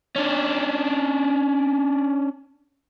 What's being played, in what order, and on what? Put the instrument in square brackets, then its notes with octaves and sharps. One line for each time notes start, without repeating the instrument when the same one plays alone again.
[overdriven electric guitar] C#4 D4